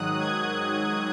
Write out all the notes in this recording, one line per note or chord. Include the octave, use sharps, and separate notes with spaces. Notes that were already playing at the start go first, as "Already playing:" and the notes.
Already playing: G#2 D#3 F#3 D#6 F#6
G#6
F#6